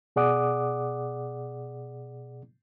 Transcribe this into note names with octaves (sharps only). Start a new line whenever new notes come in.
B2 G#4 D5 F#5 D6 D#6